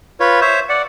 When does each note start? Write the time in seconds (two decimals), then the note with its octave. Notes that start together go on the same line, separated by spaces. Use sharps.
0.20 F4 B4 C#5
0.41 C5 C#5 E5
0.69 D5 F#5